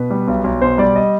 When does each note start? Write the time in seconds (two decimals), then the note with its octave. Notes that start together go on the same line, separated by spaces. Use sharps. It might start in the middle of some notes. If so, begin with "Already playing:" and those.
Already playing: B2 B4
0.10 G3
0.28 B1
0.44 B1
0.62 B2 C5
0.78 G3 D5
0.96 D#5